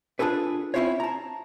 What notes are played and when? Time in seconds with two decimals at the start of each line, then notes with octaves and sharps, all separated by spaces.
0.19 D4 F4 G#4 A4 B4
0.74 C4 C#4 E4 F4 C5 C#5
1.00 A5 A#5